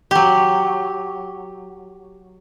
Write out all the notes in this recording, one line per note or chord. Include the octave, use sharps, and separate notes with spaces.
F#3 G4